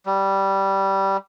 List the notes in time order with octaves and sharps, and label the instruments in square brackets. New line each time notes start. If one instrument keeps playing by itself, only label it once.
[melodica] G3